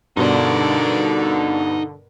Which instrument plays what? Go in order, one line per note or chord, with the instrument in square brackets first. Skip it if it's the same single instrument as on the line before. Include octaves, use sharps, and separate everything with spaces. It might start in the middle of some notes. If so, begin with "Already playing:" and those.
[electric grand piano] G2 B2 [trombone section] D3 [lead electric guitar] D#4 C6 [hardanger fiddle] A#4 D5